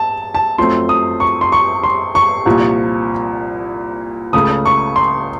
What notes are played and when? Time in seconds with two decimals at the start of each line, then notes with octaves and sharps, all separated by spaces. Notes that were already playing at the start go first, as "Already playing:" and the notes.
Already playing: A5
0.35 A5
0.58 F#2 F3 A3 C4 C6
0.89 D#6
1.20 C#6
1.41 C6
1.52 C#6
1.84 C6
2.15 C#6
2.46 C2 A#2 F3
4.33 C#2 C#3 A3 D#6
4.66 C#6
4.96 C6